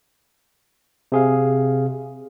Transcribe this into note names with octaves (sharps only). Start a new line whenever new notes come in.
C3 G#4 F5